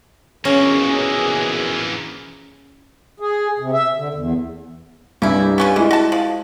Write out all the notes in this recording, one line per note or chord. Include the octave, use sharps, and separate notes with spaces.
A#1 B2 E3 A#3 C#4 G#4
G#4
C3
E5
D3
E2
C2 G2 C#3 E4
B3 C#4 F4
E3 G#3 E4
F#4 A5
F3